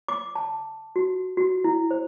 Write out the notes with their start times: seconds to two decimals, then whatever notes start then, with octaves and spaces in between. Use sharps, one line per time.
0.08 D6
0.35 A5
0.96 F#4
1.37 F#4
1.64 E4
1.91 C5